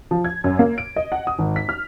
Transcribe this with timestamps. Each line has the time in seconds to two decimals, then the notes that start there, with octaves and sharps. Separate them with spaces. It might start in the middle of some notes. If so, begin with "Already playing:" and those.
0.11 F3
0.25 G#6
0.44 F#2
0.59 A#3
0.78 D7
0.96 D#5
1.12 F#5
1.27 D#6
1.39 G#1
1.56 B6
1.69 F6